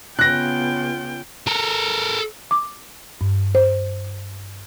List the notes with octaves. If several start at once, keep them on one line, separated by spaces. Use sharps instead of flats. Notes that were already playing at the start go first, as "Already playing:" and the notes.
C#3 B3 F4 G5 F#6 A#6
A4 A#4
D6
G2
C5